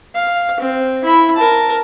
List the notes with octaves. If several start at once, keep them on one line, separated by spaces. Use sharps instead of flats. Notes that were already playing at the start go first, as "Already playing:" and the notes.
F5
C4
E4 B5
A#4 A5